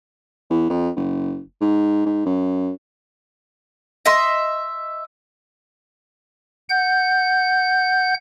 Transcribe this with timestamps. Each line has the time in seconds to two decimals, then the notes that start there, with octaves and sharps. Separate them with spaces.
0.50 E2
0.70 F2
0.96 F#1
1.61 G#2
2.06 G#2
2.26 F#2
4.06 D#5 E5 C6
6.69 F#5 G6